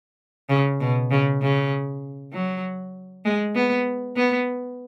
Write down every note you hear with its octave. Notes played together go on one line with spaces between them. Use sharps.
C#3
B2
C#3
C#3
F#3
G#3
B3
B3